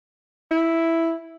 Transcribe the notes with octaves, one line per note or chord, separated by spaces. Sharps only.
E4